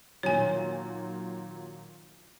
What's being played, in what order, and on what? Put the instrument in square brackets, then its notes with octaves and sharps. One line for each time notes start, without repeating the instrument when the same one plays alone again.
[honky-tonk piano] A#2 D#3 F#3 [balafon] C#5 G#5